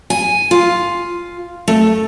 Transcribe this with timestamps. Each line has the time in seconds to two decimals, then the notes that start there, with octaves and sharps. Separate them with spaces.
0.10 G#5
0.51 F4
1.68 A3